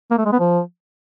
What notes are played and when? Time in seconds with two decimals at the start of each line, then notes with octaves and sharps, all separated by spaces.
0.11 A#3
0.18 A3
0.25 G#3
0.32 B3
0.39 F3